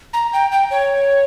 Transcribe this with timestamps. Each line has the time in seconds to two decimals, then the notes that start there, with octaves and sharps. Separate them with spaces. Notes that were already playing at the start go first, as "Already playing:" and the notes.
0.13 A#5
0.33 G5
0.52 G5
0.71 C#5